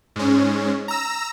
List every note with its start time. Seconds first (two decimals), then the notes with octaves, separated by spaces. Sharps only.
0.16 G#2 C#4
0.88 A#5 E6